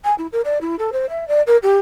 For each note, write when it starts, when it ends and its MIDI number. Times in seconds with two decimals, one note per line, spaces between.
0.04 0.14 80
0.18 0.27 64
0.32 0.41 70
0.44 0.58 74
0.61 0.75 64
0.79 0.90 69
0.92 1.09 72
1.09 1.26 76
1.28 1.42 74
1.46 1.57 70
1.63 1.79 67